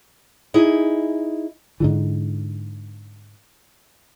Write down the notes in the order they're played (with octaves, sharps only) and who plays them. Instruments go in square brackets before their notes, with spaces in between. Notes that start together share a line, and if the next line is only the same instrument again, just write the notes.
[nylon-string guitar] D#4 E4 G#4
[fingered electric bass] G#2 D3 E3